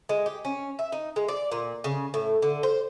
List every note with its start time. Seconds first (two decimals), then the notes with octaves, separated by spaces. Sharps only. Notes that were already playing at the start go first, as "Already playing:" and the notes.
0.09 G#3
0.26 G4
0.45 C#4
0.79 E5
0.92 D#4
1.16 G#3
1.28 D5
1.52 A#2
1.84 C#3
2.14 A2
2.42 D3
2.63 C5